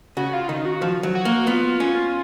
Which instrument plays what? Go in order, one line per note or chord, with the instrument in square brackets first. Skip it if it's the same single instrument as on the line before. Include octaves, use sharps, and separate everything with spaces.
[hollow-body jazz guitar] C#3 [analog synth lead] F#4
[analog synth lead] F4
[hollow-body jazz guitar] D#3 [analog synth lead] D#4
[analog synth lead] F#4
[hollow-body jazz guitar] F3
F#3
[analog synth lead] F#4
[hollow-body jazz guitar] A#3
[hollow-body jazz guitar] B3 [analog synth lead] F4
[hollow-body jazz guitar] C#4